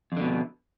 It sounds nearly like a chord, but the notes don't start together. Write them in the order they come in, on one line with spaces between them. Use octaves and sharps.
F2 D3 B2